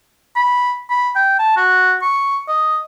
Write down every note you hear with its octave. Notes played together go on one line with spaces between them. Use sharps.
B5
B5
G5
A5
F#4
C#6
D#5